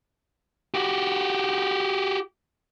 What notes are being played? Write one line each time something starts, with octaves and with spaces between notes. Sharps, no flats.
F#4 G4